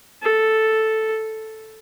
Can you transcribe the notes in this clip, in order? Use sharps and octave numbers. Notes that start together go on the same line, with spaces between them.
A4